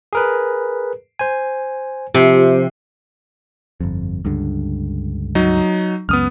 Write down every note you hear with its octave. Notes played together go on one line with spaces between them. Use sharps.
G#4 A#4 B4
C5 G#5
C3 F3 F4 G4
G1 F2
C#2 G2 D3
F#3 D#4
C#2 F#2 B3 D#6 F6